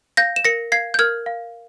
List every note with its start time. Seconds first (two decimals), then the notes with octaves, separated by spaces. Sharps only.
0.17 F5 G6 A#6
0.36 E7
0.45 A#4 A#6 C#7
0.72 F5 G#6 C7
0.94 G6
0.99 A#4 F6 G#6
1.26 F5